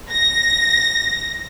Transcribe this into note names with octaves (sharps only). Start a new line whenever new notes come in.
A#6